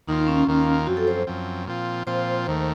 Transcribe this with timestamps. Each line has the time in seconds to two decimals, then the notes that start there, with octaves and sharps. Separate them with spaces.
0.08 D#2 D#3 A#3 D#4 F4
0.28 C#4
0.47 D#2 D#3 A#3 F4
0.87 F#2 F3 C4 F#4
0.97 A4
1.08 C5
1.27 F#2 F3 C4
1.67 A#2 F3 C4 F4
2.07 A#2 F3 C4 F4 C5
2.46 D#2 D#3 A3 C5